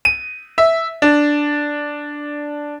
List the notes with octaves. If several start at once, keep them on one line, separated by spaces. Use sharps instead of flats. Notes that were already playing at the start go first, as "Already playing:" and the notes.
D#7
E5
D4